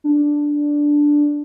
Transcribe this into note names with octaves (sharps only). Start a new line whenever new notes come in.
D4